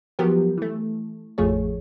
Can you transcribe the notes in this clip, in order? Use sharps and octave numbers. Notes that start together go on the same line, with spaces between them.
F3 F#3 B3 G4 A#4
E3 A3
A1 F2 F3 A3 G#4 C#5